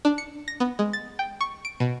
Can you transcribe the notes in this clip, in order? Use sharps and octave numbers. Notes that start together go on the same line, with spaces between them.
D4
C#7
A#6
B3
G#3
A6
G5
C#6
D7
B2